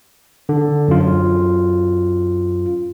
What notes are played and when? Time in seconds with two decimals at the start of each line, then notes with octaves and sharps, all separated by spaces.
0.49 D3
0.88 F#2 F4